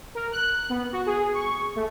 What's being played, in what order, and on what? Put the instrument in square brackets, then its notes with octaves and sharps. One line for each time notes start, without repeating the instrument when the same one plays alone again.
[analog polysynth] A#4
F#6
B3
F#4
G#4
C#6
A3